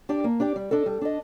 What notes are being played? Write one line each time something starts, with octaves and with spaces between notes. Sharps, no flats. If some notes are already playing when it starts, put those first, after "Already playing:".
D4 G4 D5
A#3
D4 G4 D5
G3
D4 A4 D#5
G3
D4 A4 D#5